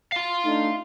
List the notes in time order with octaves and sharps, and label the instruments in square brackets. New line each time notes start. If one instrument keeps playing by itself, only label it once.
[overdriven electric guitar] F5 C6
[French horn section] A3 D4 D#4